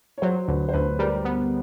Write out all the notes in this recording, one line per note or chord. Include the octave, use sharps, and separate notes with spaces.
C#5
F#3 C5
D2 B4
C5
D2 B4
G3 A#4
B3